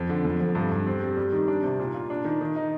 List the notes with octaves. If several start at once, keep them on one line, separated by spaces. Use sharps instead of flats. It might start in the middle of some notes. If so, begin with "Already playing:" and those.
Already playing: F2
D3
F2
F2
G2
G2
C4
G3
G3
D#3
D4
C3
A#2
F4
D4
D#3
D#3
D#4